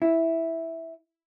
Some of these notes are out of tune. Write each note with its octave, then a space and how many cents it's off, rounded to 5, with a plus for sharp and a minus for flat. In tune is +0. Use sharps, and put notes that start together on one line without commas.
E4 -5